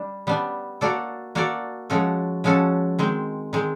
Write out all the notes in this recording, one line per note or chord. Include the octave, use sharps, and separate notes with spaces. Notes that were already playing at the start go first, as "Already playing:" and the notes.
Already playing: G3 D4
G3 B3 D4
A#3 D4 F#4 A4 D5
A#3 D4 F#4 A4 D5
F3 G#3 C#4 F#4 A4
F3 G#3 C#4 F#4 A4
D#3 G#3 C4
D#3 G#3 C4